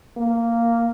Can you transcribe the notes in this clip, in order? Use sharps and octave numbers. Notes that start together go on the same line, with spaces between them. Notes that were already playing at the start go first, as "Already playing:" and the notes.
A#3